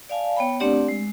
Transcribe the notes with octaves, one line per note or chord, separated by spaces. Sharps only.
D5 F5 G#5 A5
B3 C#5 G5 B5
A3 C4 D4 G4 D5 F#5
G#3